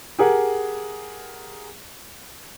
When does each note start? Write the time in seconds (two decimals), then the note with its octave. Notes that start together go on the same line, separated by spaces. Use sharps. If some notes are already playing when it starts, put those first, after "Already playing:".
0.19 G4 G#4 A#4 F#5